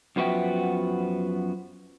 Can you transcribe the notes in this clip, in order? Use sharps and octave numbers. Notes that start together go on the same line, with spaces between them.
F#2 F3 B3 F#4 E5 G5